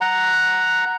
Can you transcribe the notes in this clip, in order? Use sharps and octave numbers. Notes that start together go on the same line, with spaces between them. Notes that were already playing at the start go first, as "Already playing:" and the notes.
F#5 A#5